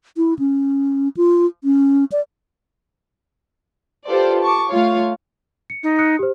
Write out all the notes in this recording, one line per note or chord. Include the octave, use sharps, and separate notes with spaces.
E4
C#4
F4
C#4
D5
F4 G4 A4 B4 C5 D5
A5 C#6 D6
A3 F4 C#5 F5
C#7
D#4
D#6 F#6 C#7
G4 C5